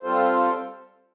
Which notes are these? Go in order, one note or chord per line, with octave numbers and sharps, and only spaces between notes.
G3 C4 F4 A4 C5